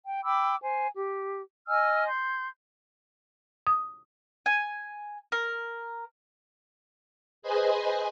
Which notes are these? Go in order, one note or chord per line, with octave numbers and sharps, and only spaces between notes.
G5
G5 B5 D6 E6
C5 G#5
G4
D#5 G#5 E6 F6
C6 G6
D#6
G#5
A#4
G#4 B4 C5 D#5 G#5